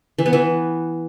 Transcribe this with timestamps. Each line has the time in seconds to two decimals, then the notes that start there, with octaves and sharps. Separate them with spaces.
0.18 E3
0.26 B3
0.33 E3